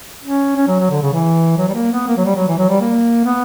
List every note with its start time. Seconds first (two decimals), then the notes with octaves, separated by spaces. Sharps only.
0.23 C#4
0.57 C#4
0.68 F#3
0.80 F#3
0.91 D3
1.02 C#3
1.13 E3
1.58 F#3
1.68 G3
1.74 A#3
1.91 B3
2.08 A#3
2.17 F#3
2.25 G3
2.36 F#3
2.48 E3
2.58 F#3
2.69 G3
2.80 A#3
3.25 B3